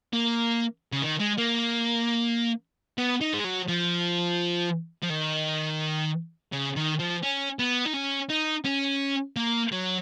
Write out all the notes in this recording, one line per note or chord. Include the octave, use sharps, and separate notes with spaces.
A#3
C#3
D#3
G#3
A#3
B3
D#4
G#3
F#3
F3
F3
D#3
C#3
D#3
F3
C#4
B3
D#4
C#4
D#4
C#4
A#3
F#3